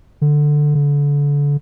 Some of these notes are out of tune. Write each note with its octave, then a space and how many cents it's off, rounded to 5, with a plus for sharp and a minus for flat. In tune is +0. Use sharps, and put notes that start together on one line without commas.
D3 +10
D3 -30